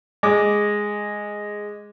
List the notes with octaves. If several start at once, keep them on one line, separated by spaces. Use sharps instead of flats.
G#3 D6